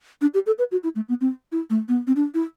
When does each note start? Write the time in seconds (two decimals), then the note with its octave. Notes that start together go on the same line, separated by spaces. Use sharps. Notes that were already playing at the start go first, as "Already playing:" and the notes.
0.21 D4
0.34 G4
0.46 A4
0.59 B4
0.72 F#4
0.84 E4
0.96 A3
1.09 B3
1.21 C4
1.52 E4
1.70 A3
1.88 B3
2.07 C4
2.16 D4
2.34 E4